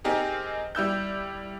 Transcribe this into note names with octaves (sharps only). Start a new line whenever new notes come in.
C4 D#4 G4 G#4 A#4
G3 E4 E6 G6